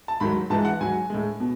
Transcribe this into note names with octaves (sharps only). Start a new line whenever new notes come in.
A5
G#2 D#3 F#3 B5
G#2 E3 G#3 A5
F#5
G#2 F#3 G#5
A2 G#3
B2